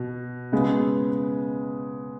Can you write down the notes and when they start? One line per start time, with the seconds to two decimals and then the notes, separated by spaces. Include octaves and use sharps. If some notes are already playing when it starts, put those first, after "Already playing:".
Already playing: B2
0.52 C#3 G#3 B3